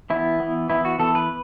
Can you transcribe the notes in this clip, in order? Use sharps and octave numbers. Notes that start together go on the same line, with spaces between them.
E3 B3 E4
E3 B3
E3 B3 E4
F#4
E3 B3 A4
B4